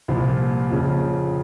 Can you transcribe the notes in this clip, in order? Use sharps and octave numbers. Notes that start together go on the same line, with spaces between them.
C2 A#2 F3
F2 C#3